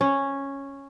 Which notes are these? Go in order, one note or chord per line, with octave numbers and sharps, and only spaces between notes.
C#4